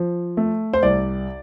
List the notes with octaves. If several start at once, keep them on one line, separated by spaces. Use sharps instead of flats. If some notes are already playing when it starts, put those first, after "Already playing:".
Already playing: F3
A3
C5
C2 D5